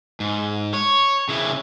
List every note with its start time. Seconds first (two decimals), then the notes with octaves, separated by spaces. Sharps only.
0.20 G#2
0.73 C#5
1.29 C#3 E4